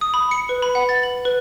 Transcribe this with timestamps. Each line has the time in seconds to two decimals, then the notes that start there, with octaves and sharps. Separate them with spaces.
0.01 D#6
0.14 B5
0.31 C#7
0.49 B4
0.62 B5
0.75 F#5
0.89 A6
1.03 F#7
1.25 B4